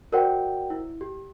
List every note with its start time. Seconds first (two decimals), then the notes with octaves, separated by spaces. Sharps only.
0.12 F#4 A#4 C5 D5 F#5 G5
0.70 E4
1.01 G4